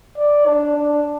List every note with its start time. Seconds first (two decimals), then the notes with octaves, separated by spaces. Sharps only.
0.17 D5
0.47 D4
0.76 D4